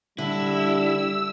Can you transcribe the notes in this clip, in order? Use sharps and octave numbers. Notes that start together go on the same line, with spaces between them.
D3 G3 E4 E6